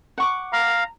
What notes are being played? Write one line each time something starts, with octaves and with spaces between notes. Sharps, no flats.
F#5 C#6 D6
F5 A#5